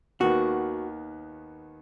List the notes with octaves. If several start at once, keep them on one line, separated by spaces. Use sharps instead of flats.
D#2 D#3 B3 F#4